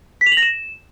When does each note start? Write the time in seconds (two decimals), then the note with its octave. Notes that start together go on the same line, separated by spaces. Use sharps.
0.21 B6
0.26 F7
0.32 F#7
0.37 A#6
0.42 E7